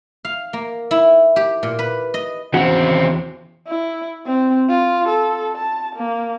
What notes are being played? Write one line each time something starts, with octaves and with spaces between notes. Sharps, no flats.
F5
A#3
E4
G4
A#2
B4
D#5
E2 C#3 C4 F#4 F#5
E4
C4
F4
A4
A5
A#3